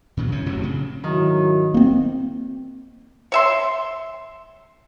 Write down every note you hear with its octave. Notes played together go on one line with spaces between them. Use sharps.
A#2 C#3 E3 F#3
F#1 F#2 E3 C#4
F1 A2 C3 F#3
C#3 C4
G#2 D#3 F#3 E4
A#3 C4
C#5 E5 C6